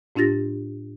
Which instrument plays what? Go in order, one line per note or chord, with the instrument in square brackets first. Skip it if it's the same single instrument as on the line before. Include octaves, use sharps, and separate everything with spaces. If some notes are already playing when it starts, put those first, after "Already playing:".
[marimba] A2 D4 F4 G4 A6 A#6